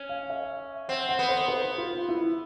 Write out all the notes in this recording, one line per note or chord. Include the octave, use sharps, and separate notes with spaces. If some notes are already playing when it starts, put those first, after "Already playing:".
Already playing: C#4
F5
E5
C4 F#5
F#5
B3
C5
B4
F4
E4